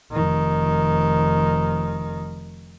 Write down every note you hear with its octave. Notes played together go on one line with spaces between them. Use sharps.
F1 D#3